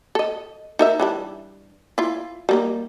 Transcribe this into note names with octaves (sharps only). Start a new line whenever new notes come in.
A4 D#5
D#4 A#4 E5
E3 G3 D4
E4 F4
G3 A#3 D#4